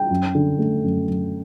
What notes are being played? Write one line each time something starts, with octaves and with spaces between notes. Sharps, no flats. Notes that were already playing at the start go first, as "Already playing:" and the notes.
Already playing: G5
F#2
D3
A3
F#2
F#2